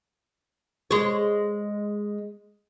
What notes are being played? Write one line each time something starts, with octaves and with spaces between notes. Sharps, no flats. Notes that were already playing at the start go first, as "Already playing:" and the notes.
G#3 C#5